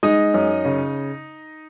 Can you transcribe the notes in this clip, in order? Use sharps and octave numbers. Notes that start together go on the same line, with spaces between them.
G#3 D#4 D#5
F#2
C#3